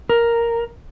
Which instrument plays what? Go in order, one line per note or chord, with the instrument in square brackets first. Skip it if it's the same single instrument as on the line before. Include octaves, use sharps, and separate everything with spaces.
[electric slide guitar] A#4